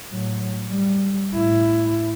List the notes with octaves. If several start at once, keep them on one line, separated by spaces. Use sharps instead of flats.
A2 F#3
G3
A2 E4